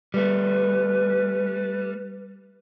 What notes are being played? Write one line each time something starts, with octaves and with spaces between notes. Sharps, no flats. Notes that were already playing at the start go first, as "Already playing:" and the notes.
G3 A3 B4